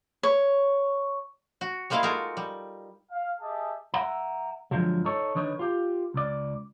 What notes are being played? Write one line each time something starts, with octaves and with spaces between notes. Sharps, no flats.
C#5
F#4
G3 G#3 A#3 E4 G#4 F5
G#3 D#4 F4 F#4 A4 A#4
G3
F5
G4 G#4 D#5 E5 G#5 A5
E5 F#5 A#5
G2 D3 F3 F#3 G#3
D#4 A4 C#5
D3 D#3 D4 D#4 B4 C#5
F4 G4
C#2 D5